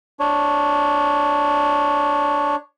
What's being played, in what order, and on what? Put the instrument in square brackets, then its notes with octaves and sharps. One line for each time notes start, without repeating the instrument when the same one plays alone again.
[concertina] D4 C#5